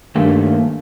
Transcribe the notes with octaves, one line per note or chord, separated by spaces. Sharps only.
G2 D#3 A3 A#3